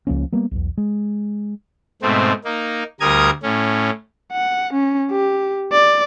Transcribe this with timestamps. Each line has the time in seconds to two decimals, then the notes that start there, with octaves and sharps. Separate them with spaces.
0.07 C#2 F3 A#3 C#4
0.32 G3 A#3 B3
0.51 B1 E2
0.78 G#3
2.02 G#2 B2 A3 C4
2.45 A#3 D#4
3.00 D2 G3 A#4 A#5 D#6 G#6
3.43 A2 C#4
4.32 F#5
4.73 C#4
5.11 G4
5.72 D5